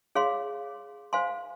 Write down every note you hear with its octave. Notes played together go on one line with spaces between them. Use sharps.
G#4 C#5 F5 C6
C5 F5 G#5 C6